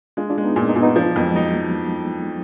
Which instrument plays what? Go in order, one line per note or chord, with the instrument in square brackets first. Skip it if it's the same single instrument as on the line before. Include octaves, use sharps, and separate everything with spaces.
[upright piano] G#3 [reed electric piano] D4 F4
[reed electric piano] D4 F4
[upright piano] G#3
[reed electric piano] B3 D#4
[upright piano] A#2 [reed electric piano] A#3 D4
[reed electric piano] B3 D#4
[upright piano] A#2
[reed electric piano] B3 D#4
[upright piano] F3 [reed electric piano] D4 F4
[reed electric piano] B3 D#4
[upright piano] F2 [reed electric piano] F#3 A#3
[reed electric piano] F3 G#3
[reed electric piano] F#3 [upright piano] D#4